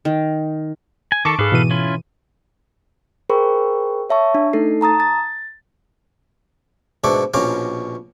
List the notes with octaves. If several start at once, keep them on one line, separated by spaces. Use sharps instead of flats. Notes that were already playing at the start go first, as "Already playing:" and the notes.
D#3
G#5
D#3 A4 A5 C#6 D6
G#2 G#4 A4 B4 F5
B2 E3 D#7
C#4 E4 F4
G#4 A#4 C5 G5 B5 C#6
C#5 E5 A5 C#6
D4
A3 D#4 A4 C7
A5 A#5 D#6 A6
A6
G#2 B2 D4 E5 C#6 D6
A#1 B2 C#4 F5 A#5 D6